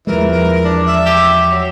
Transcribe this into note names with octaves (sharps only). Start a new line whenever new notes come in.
E2 E3 F3 G#3 A#4
A#4
D4
E5
G4
F#3